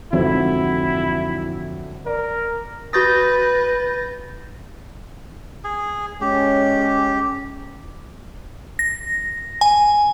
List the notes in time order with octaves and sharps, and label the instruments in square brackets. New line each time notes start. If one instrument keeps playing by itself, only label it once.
[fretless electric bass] F2 G#2 E3 [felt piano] D3 F#3 C4 [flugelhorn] E4
[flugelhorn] A#4 [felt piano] D5
[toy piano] F#4 C#6 D#6 [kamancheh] B4 [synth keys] G6 A6 A#6
[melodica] G#4
[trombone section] G#3 C#4 [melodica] G4
[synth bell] A#6
G#5